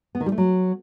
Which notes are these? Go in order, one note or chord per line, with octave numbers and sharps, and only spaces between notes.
B3
D#3
G3
A3
F#3